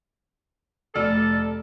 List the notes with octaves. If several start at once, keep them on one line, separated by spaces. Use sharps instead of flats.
F1 A4 D5 F6